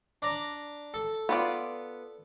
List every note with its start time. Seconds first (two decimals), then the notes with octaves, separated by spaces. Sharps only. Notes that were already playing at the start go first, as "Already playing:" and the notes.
0.22 D4 D5 A#5
0.94 A4
1.29 B3 F4 D5